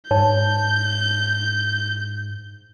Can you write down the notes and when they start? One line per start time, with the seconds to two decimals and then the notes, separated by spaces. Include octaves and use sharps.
0.11 G#2 C#5 A5 G6